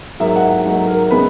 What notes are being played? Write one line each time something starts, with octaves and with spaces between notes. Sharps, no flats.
G#2 F#3 A#3 E5
F#5
F#5
G#2 F#3 A#3 F#5
A#4
C#3 G#3 B3 B4